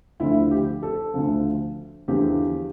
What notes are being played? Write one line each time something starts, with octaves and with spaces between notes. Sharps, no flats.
D2 D3 F3 E4
G4
A4
D2 D3 F3
E2 D3 F3 G4